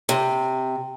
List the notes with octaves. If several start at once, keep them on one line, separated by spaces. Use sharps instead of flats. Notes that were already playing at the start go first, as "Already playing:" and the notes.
C3